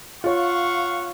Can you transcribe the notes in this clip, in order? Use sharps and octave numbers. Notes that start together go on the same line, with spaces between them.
F4 C#5 F5 F#5 C#6